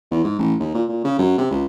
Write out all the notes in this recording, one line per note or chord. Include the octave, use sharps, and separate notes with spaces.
E2
G#2
A1
D#2
A#2
A#2
C#3
F#2
C3
C#2